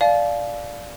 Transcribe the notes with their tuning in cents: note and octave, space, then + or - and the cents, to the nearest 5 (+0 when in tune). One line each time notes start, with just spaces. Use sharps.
D5 +0 F5 +0 A5 -45